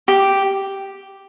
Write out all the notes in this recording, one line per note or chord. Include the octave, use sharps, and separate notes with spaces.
G4